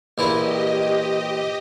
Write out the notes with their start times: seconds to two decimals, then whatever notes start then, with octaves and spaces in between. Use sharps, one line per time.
0.18 A#1 E3 E4 G4 D#5